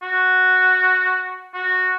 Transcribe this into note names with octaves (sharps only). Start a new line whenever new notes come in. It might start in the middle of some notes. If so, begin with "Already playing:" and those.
F#4
F#4